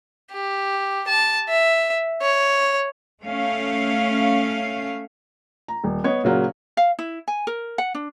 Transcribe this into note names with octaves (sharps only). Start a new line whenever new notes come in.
G4
A5
E5
C#5
A3 C#4 F5
A#5
D#1
B3 C#5 D#5
A#2 C#3 F#3 A#4
F5
E4
G#5
A#4
F#5
D4